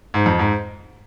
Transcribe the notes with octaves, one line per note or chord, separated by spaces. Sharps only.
G#2
F2
G#2